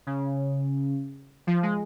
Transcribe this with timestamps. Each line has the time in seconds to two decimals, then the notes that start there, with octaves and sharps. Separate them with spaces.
0.07 C#3
1.47 F3
1.63 G#3